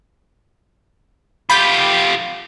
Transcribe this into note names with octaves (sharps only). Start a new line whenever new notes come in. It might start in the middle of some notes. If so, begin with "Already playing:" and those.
F4 G4 B5 G6 B6